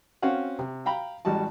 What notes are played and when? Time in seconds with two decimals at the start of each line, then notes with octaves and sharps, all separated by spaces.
0.22 C4 C#4 F#4 F5 F#5
0.59 C3
0.86 F5 G5 A#5 B5
1.25 A1 G3 G#3 F#4 A5